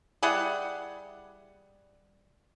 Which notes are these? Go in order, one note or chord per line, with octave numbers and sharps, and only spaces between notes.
G3 E4 G#4 F#5